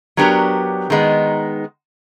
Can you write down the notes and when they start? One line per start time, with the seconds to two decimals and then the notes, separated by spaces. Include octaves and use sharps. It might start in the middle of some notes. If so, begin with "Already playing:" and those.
0.17 F#3 B3 D4 G4 A#4
0.90 D#3 G#3 B3 D#4